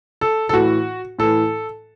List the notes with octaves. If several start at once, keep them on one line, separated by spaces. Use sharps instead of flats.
A4
A4
A2 E3 F#4
A2 E3 A4